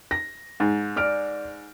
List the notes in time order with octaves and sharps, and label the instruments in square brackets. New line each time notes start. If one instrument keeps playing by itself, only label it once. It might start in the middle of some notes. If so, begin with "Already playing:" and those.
[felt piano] A#6
[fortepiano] G#2
[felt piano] D5 F6 D7